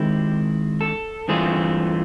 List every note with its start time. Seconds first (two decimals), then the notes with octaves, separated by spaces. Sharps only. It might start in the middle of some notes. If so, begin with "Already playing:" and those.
Already playing: D#3 G#3 C4 E4 G4
0.81 A4
1.28 G2 E3 A3 C4 F4 G#4